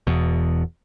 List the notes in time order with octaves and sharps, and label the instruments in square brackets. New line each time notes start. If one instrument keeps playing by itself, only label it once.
[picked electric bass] E1 E2 B2